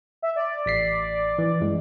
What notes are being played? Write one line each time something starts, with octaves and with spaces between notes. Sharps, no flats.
E5
D5
A1 B6 C7
E3
F#2 E3 G#3